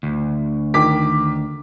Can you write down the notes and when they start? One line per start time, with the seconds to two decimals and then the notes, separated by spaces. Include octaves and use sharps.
0.03 D2
0.74 D#3 D6 B6